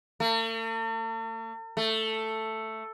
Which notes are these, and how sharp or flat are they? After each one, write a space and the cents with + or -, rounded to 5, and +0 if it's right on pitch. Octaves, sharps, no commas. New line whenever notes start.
A3 +45
A3 +5